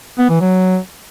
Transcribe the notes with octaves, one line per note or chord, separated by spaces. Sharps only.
B3
E3
F#3